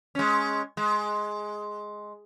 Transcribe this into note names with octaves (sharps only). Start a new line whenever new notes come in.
G#3 C#4
G#3